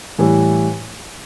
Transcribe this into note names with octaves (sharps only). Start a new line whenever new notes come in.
A2 E3 G3